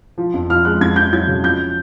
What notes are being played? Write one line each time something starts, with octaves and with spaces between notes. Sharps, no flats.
F3
F2
F3 F6
G#3 F#6
F2 G#6
F2 G6
F#3 G#6
C#3
F3 G6